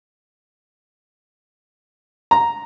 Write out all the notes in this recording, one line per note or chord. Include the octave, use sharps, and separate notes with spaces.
A#5